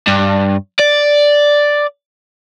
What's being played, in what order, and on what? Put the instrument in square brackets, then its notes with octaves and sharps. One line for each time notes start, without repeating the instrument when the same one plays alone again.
[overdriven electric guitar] G2
D5